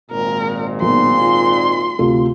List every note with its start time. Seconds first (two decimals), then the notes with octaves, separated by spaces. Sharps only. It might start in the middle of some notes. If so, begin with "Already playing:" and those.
0.11 G#1 A#2 A#4
0.82 B1 A#3 C6
1.21 F4
1.99 D2 C3 F4